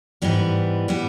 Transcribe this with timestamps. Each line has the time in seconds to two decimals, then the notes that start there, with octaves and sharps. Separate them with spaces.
0.22 G#2 E3 G3 B3
0.88 E3 G3 B3